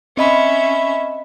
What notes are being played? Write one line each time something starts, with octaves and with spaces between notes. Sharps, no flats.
C4 C#4 D#5 E5 B5